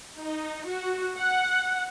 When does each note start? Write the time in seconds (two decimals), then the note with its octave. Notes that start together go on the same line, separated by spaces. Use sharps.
0.17 D#4
0.68 F#4
1.17 F#5